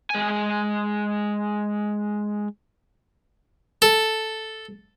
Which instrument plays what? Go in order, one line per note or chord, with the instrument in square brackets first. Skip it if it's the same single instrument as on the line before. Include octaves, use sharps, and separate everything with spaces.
[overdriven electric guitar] G#3 G#5
[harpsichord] A4